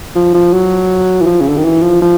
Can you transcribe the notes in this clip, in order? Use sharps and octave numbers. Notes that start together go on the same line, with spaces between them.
F3
F3
F#3
E3
F3
C#3
D3
D#3
E3
F3
F3